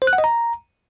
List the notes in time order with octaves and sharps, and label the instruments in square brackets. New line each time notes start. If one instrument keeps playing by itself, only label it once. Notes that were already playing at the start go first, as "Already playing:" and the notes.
[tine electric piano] C5
F#6
F#5
D#5
A#5